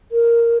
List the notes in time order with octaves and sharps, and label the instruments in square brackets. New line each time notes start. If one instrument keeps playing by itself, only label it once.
[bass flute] A#4